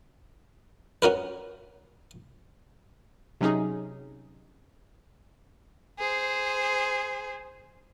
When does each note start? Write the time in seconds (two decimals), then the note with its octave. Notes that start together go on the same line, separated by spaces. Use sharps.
1.02 C#4 F#4 A#4 B4
3.41 C3 F#3 C#4 D#4 G#4
5.99 G#4 C5